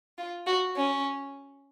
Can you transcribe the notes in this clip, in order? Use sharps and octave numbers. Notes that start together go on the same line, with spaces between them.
F4
F#4
C#4